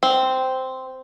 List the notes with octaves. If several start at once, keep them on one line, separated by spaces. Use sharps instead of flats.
C4